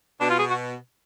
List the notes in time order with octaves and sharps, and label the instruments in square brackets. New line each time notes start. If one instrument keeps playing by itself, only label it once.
[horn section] B2 [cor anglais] D4
[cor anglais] F4
G#4
F#4